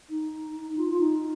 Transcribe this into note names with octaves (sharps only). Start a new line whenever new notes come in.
D#4
F4
F4
D#4